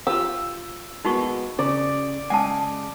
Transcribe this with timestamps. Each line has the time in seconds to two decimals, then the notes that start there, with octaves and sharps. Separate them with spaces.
0.07 F4 G4 E6
1.05 G#3 A#3 B3 D#4 F#4 C#6
1.59 C#3 D5
2.30 C#3 G#3 F#5 G#5 A5